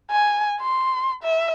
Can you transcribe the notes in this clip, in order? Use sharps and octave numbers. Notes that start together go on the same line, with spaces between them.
G#5
C6
E5